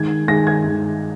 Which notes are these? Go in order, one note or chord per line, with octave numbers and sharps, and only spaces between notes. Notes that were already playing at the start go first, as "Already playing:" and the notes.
Already playing: D#3 G#3 G#6
D#3 G#3 A#6
G#6
D#3 G#3